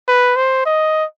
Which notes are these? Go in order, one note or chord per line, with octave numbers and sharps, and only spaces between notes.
B4
C5
D#5